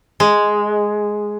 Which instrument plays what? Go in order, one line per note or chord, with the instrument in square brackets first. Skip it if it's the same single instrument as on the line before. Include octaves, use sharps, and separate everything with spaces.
[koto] G#3